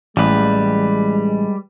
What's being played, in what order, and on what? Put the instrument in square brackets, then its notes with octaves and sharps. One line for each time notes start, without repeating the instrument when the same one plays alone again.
[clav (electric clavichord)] A1 [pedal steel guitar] G3 B4 [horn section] G#3